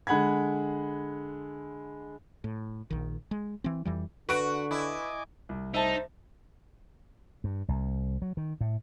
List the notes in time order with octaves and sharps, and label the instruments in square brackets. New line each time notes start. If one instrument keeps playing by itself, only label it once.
[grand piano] D3 G#3 F#5 B5 G#6
[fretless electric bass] A2
A#1 D#3
G#3
E3 C4
F2 E3 G3
[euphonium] D3 [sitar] F#4 [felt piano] B4 D7
[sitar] E4 [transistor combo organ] D#5 G#5 D6
[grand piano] C2
[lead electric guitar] D#4 [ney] C5 [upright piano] E5 A5
[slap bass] G2
C2
F#3
D#3
A2